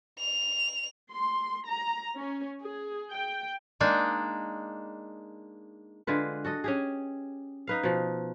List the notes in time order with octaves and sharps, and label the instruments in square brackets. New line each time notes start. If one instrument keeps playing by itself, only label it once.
[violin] F7
[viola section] C6
A#5
C#4
G#4
G5
[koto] G#3 A#3 D4 D#4
[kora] D3 G#3 F4 B4
F#4 A4 D#5
C#4 G4 G#4
D#4 B4 F5
B2 F3